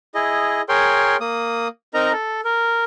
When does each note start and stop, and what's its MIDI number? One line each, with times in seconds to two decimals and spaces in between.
0.15 0.62 64
0.15 0.62 68
0.15 0.62 75
0.69 1.17 68
0.69 1.17 70
0.69 1.17 73
0.69 1.17 79
0.69 1.17 84
1.20 1.68 58
1.20 1.68 87
1.94 2.12 60
1.94 2.12 63
1.94 2.12 70
1.94 2.12 75
1.94 2.12 82
2.13 2.41 69
2.45 2.84 70